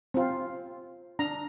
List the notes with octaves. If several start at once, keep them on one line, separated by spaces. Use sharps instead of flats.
C4 F4
D4 A#5